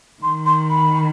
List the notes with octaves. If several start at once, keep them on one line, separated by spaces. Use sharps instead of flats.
D#3 C6
C6
B5